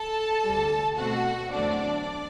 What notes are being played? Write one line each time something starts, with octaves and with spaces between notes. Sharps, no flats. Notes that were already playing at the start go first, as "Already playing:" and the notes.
Already playing: A4 A5
D2 C3 G3
B2 A3 C4 F#4 F#5
E2 D3 F#3 A3 C4 D4 D5